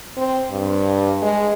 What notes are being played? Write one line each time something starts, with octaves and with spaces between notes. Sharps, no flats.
C4
G2
G#3